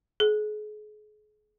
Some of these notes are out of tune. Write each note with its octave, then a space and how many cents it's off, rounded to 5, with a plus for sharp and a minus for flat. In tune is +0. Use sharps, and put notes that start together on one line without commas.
G#4 +35